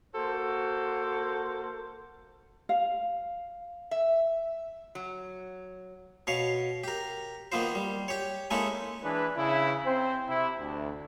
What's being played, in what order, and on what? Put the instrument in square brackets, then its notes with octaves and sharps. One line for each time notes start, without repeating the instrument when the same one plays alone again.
[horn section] A#3 F#4 A4 C5
[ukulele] F5
[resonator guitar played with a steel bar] E5
F#3
[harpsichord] B2 C#5 F5
G4 A#4
D#3 A#3 B3 F4 C5
G3
G4 C#5
G#3 A#3 C#4 D#4 E4 A4
[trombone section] E3 D4 G#4 B4
C#3 E4
C4 C5
C3 E4
D2